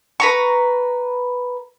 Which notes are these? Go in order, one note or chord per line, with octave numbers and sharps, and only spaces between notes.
B4 A#5 C#6